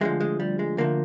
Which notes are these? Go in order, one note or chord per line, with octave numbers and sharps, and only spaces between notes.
D2 D3 F3 G#3
G#3
G3
G#3
D2 D3 F3 A#3